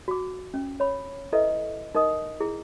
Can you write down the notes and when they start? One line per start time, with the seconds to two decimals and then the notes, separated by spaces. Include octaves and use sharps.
0.08 F#4 D6
0.54 C#4
0.80 C#5 B5
1.32 E4 A4 B4 D#5 E5
1.95 D#4 A#4 D#5 D#6
2.40 E4 G#4